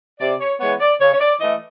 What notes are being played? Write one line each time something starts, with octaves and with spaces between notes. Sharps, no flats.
C3 D5
C#5
E3 G#3 B3 C#5
D5
C#3 C#5
C#5
D5
E3 A3 D#5